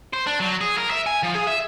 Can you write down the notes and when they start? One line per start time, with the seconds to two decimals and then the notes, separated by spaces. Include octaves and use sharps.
0.13 C5
0.26 D4
0.40 F#3
0.61 G#4
0.78 A#4
0.90 E5
1.06 G#5
1.23 F3
1.35 G#4
1.47 E5